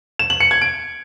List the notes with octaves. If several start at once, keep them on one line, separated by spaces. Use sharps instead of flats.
E7
F#7
C#7
G#6
D7